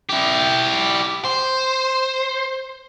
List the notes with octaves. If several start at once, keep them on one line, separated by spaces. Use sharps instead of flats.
E4 G4
C5